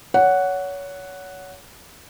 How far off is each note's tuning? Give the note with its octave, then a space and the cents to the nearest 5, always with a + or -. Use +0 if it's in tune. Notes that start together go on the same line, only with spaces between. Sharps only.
C#5 +25 F#5 +0